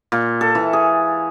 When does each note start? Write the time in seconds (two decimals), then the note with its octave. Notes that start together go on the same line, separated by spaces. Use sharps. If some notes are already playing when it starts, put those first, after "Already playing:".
0.12 A#2
0.41 A4
0.55 E3
0.73 G#4